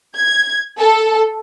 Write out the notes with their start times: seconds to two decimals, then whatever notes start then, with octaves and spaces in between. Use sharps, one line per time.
0.17 G#6
0.78 A4